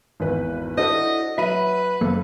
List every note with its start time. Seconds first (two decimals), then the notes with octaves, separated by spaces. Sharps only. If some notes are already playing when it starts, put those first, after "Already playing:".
0.20 G#1 E2 B4
0.78 D4 E4 F#4 A4 C5 D#5
1.38 F#3 B4 E5 B5 D#7
2.01 F#1 A#3 A4